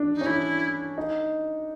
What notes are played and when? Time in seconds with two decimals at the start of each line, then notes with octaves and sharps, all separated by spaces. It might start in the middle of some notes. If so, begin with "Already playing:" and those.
Already playing: D4
0.14 D#4
0.21 C#4
0.26 D4 E4
0.98 D#4